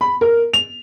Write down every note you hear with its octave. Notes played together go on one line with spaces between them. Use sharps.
B5
A#4
F7